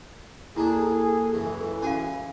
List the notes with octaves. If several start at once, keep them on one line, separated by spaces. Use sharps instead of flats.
D#2 D4 E4 G#4 A4 A#5
C#2 F#2 E3
C#4 F#4 G#4 F5 G#5